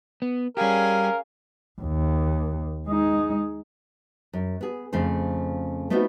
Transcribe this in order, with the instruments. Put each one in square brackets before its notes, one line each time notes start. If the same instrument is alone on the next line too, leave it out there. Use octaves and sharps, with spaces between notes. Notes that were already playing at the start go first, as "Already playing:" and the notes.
[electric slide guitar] B3
[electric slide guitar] G3 G4 [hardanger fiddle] C#4 G#4 [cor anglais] A#4 [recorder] F5
[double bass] D#2
G#3 D#4
[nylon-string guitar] F#2
B3 G#4
F2 C#3 A3 C5
A3 B3 C4 D#4 F4 F#4